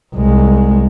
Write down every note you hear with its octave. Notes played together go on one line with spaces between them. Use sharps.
C2 G#3